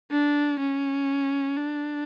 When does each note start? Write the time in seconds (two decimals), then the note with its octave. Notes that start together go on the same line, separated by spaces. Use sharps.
0.11 D4
0.60 C#4
1.57 D4